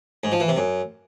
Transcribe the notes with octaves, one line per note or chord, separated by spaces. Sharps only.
G#2
F3
E3
C3
F#2